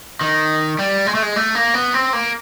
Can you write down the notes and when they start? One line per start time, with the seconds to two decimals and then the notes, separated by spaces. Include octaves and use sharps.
0.21 D#3
0.79 G3
1.06 G#3
1.15 A3
1.22 G#3
1.36 A3
1.55 A#3
1.74 B3
1.94 C4
2.13 A#3